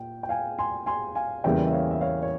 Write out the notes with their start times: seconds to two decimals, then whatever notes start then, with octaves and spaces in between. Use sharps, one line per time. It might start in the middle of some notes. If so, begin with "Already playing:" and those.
Already playing: A#2 G5
0.23 G5
0.29 F5 G#5
0.59 G#5 C6
0.86 G#5 C6
1.15 F5 G#5
1.44 E2 C#3 E3 G3 A#3 E5 G5
1.67 E5
1.72 C#5 F5
1.91 E5
2.01 C#5 F5
2.23 C#5